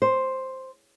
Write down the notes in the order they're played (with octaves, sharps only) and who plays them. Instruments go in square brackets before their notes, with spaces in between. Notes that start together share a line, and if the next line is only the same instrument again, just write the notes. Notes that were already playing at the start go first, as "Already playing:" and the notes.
[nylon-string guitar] C5